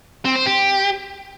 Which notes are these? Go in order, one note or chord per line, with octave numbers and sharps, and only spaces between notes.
C4
C5
G4